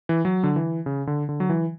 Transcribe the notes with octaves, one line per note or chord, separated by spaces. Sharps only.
E3
F#3
D3
E3
C#3
D3
D3
F#3
E3